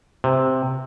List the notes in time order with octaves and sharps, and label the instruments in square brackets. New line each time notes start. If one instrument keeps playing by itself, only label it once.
[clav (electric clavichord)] C3